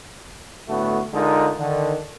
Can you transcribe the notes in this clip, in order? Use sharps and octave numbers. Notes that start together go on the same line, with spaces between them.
A2 D3 A3 B3 F#4
D3 G#3 D#4 F4 A#4
D3 D#3